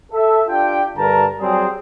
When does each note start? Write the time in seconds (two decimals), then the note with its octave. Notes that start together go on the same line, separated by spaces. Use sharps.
0.12 A4 E5
0.48 D4 F4 G4 G5
0.96 G2 D3 A#4 A5 A#5
1.39 F#3 G3 C4 G#4